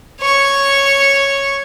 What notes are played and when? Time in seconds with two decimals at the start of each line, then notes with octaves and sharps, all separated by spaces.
0.20 C#5 C#6